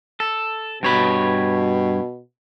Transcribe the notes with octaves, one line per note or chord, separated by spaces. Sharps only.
A4
G2 B2 C#5 B5